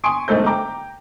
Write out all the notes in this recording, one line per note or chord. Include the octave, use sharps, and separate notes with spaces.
G#5 C6 C#6 D#6 D7
B1 G#2 A3 A4 C5 G6
G5 A#5 D6